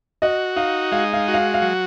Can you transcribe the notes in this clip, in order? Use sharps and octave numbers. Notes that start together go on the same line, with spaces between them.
F#4 D#5
D#4 F5
G#3 F5
F5
F#4
F5
F5
F#3